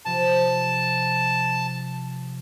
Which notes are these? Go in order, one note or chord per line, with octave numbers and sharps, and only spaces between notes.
C3 F3 A5